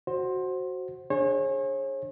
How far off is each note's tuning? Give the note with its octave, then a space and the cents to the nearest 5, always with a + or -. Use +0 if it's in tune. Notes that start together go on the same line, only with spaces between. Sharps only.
F#4 +0 C5 +15
D4 +10 G#4 +0 C#5 -40